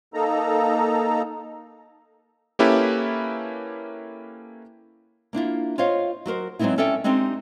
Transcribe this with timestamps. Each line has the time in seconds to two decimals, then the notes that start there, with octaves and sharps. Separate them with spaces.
0.14 A#3 D#4 A4 A#5
2.59 A#3 C#4 E4 G4 A4 B4
5.33 A#3 D4 E4 F4
5.78 F4 C5 C#5 D#5 F5
6.26 F#3 F#4 A#4 C5
6.59 F#3 G#3 B3 C4 D#4 E4
6.78 C#4 A4 D5 E5 G5
7.04 G#3 C4 D4 D#4 G4